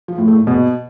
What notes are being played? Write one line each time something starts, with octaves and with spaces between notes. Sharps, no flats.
F3
A2
A3
A#2
B2